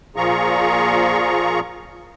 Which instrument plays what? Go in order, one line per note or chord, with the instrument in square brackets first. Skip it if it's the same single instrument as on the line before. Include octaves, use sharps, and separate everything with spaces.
[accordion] A#2 F3 F4 G#4 A#5 C#6